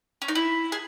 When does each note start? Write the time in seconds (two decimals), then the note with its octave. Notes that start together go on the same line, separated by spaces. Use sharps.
0.22 C#4
0.28 D#4
0.35 E4
0.72 G#4